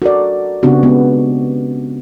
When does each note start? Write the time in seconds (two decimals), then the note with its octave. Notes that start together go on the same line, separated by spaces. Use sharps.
0.02 F#4 A4 A#4 D5
0.63 C#3 B3 C4 D4 F#4 G4
0.83 G#3 B3